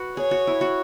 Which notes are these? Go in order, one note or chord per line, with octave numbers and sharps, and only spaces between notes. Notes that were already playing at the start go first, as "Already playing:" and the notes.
Already playing: F#4 B4
G#4 C#5
F#4
E4
F#4